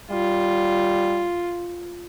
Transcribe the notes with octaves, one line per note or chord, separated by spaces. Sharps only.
G3 F4